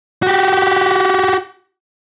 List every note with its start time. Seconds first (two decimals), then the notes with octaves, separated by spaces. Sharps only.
0.23 F#4 G4